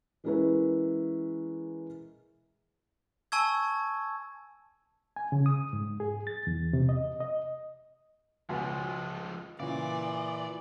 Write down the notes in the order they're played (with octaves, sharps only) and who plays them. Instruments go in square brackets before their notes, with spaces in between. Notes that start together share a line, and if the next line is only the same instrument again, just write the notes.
[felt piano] E3 G#3 C#4 E4 A#4 B4
[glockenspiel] G#5 A5 C#6 E6 G#6
[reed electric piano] G#5
C#3
D#6
G#2
G#4
A6
E2
C3
D#5
D#5
[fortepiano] C#2 B2 [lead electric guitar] F3 G#3
[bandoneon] A#2 E3 [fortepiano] C#3 [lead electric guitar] D5